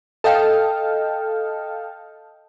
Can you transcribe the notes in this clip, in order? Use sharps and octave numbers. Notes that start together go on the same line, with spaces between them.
A4 D#5 F5 G5